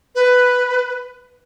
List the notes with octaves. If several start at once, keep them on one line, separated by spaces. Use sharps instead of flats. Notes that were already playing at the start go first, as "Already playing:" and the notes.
B4